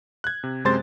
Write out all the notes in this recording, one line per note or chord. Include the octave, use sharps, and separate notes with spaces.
F#6 G#6
C3
F#2 C3 G#3 C5 C6 A6